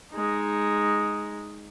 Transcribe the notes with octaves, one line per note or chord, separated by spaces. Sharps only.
G#3 D#4